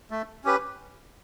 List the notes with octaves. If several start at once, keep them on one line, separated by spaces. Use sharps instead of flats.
A3
C#4 G4 B4